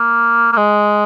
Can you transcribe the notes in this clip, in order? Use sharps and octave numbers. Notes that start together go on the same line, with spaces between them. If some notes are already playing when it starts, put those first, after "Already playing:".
Already playing: A#3
A#3
G#3